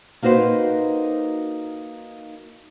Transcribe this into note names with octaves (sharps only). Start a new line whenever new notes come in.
A#3 D#4 F#4 B4 C5